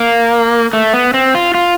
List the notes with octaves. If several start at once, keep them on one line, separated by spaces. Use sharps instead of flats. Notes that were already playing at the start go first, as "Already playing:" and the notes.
Already playing: A#3
A3
B3
C4
F4
F4